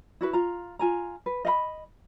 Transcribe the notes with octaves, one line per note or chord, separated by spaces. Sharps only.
E4 F#4 B4
F4 A#5
F4 G#5 A#5
B4
D#5 F5 B5